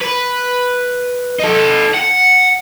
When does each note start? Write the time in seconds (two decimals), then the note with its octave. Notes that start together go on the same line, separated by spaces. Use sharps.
0.02 B4
1.39 D#4 A4
1.94 F#5